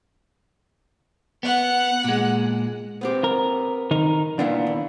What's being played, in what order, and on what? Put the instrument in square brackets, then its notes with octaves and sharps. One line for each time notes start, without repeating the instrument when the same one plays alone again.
[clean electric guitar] B3 [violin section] F#5
[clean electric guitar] A#2 G#3
[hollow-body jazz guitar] B3 C4 G4
[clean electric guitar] A#4
D#3 D#4 A#4
[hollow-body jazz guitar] A#2 E4 F5 [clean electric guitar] B3 D4
[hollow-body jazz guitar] D#2